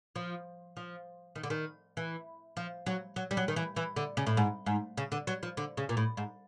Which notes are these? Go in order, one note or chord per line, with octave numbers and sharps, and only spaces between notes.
F3
F3
D#3
D3
D#3
E3
F3
F#3
F#3
G3
F#3
D#3
E3
E3
D3
C#3
A2
G#2
G#2
C#3
D3
F#3
F3
D3
C#3
A#2
A2
G#2